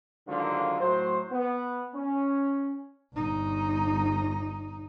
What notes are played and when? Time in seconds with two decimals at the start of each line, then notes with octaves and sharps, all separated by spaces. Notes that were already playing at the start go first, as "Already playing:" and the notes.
0.27 G#2 D3 D#3 F#3 A#3 F4
0.81 A2 F#3 C5
1.32 B3
1.94 C#4
3.14 G1 D#4